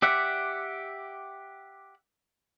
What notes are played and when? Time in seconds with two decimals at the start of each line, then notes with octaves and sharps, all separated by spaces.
0.02 G4 D5 E5 F#5